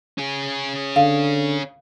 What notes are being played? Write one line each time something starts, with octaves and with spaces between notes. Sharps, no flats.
C#4 G#4
D3 F5